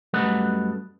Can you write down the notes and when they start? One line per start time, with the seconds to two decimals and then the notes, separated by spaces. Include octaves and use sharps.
0.14 F#2 G3 A3 B4 D#5 F#5